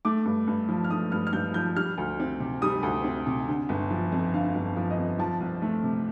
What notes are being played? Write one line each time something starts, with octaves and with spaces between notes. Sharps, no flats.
A3 D6
G2
G2
F3
F6
A3 D#6
G2 F6
F6
G2 G6
F3 G6
G3 F6
D2
C4
C3
G3 D#6
D2
C4
C3
D3
G1
F3
F2
D3 F5
G1
F3
D#5
F2
F3 A5
C2
A3
C3